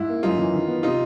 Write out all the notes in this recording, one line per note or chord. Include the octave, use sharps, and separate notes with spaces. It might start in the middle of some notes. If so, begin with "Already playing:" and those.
Already playing: G#2 E4
A#3
F#2 D#4 F4
E3
D#3
B3
C3 D#4 F4